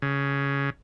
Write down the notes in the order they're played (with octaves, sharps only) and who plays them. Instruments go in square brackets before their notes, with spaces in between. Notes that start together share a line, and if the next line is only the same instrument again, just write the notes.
[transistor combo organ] C#3